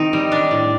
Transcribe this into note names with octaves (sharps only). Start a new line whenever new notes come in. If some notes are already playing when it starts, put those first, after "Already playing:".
Already playing: D#3 C4 D#4
G3
D4
A2